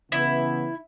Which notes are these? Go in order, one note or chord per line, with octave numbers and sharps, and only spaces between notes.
C#3 E3 B3 E4